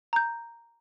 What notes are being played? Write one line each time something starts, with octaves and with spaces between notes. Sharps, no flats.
A#5 G6